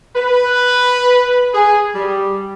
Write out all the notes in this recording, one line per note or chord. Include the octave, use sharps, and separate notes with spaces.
B4
G#4
G3